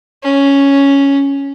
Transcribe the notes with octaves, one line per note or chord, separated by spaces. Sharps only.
C#4